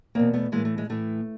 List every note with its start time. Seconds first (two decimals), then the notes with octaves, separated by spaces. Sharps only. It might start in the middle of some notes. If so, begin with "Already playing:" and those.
0.15 E2 B2 A#3 C4
0.34 A3 B3
0.52 A2 E3 G#3 A#3
0.65 A3
0.78 G#3
0.90 A2 E3 A3